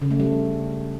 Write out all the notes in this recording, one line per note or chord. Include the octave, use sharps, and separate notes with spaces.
C#3
A3
G3